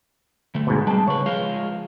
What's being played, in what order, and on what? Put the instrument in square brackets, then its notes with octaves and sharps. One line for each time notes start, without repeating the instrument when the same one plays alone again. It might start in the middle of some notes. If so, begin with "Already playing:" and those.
[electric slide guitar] D3 A3
[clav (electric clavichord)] G#2 B2
[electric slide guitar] G3 C4 [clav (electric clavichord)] G#3 A5
[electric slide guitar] C#3 B4 [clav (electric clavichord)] C#5
[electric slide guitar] F3 G#3 F4